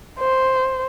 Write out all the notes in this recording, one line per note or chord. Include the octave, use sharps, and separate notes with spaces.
C5